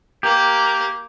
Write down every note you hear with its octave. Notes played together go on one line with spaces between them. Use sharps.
A#3 G4 A#4